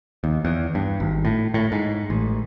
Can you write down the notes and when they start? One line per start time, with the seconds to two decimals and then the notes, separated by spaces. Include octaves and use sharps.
0.24 D#2
0.45 E2
0.75 G2
1.00 G#1
1.25 A2
1.54 A2
1.72 G#2
2.10 A1